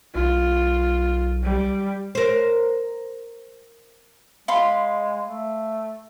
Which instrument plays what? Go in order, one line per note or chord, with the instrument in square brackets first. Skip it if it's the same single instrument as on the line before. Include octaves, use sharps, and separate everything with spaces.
[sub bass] B1 [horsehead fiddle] F4
[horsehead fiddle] G3
[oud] A#4 C5
[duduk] G#3 [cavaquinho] F5 B5 C6
[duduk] A3